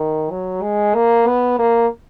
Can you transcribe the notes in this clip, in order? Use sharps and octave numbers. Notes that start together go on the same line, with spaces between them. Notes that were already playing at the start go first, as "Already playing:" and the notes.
Already playing: D#3
F#3
G#3
A#3
B3
A#3